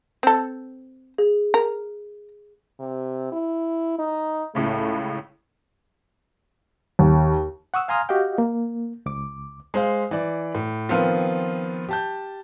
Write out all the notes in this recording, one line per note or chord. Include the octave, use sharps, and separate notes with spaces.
C4 A4
G#4
A#4
C3
E4
D#4
C#2 A2 C#3 A3
D#2
F#5 C#6 D#6 E6
F5 G#5 A#5 C6 D#6 F6
F#4 G4 D#5 F5 G5
A#3
C#2 D6
G#3 C5 F5
E3 D5
A2
D#3 F3 B3 C4 F4
G4 A5 G6